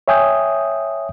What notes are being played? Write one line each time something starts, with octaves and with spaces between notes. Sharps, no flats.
C#5 E5 G5 G#5 D#6 G6